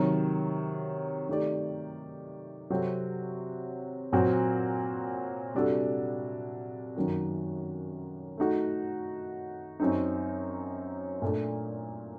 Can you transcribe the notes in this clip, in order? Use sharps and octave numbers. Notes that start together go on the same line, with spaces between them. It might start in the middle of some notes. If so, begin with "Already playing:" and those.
Already playing: C3 D#3 F#3
D#3 A3 D#4 G4 D5
C3 F#3 C4 F#4 A4
A#2 F#3 C4 F#4
C3 G3 D4 F#4 A4
F#2 D#3 F#3 A#3 F#4
A3 D#4 F#4
F#2 F#3 C4 D#4
A#2 A3 D4